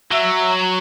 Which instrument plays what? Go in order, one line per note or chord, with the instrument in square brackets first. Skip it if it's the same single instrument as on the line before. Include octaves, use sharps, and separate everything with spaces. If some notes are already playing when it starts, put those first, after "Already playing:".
[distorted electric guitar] F#3 [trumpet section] E5